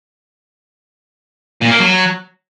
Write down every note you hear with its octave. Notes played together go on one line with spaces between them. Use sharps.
A#2
A#3
F#3